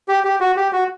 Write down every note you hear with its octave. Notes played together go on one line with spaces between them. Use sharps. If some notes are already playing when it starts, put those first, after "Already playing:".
G4
G4
F#4
G4
F#4